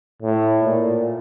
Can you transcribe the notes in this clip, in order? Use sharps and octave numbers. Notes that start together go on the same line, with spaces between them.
A2
A#2